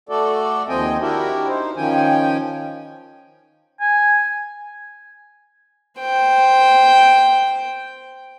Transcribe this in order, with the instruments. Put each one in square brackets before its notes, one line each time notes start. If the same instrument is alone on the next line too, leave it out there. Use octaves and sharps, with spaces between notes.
[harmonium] A3 F#4 A4 D5
D#2 F3 C4 D#5 G5 G#5
D4 E4 F#4 G4 A#4 E5
D#4 C5
D#3 F3 C#4 G5 G#5
[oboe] G#5
[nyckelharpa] C5 G5